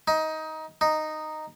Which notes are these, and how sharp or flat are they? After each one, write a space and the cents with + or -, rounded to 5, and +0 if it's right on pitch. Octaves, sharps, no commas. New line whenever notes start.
D#4 +20
D#4 -5